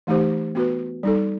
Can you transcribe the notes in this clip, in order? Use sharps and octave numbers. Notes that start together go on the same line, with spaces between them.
E3 A3 D#4 G4 C5
B3 F#4 B4
G3 D#4 A4